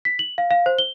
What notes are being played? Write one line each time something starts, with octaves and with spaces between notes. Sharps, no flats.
B6
F#7
F5
F5
C5
G7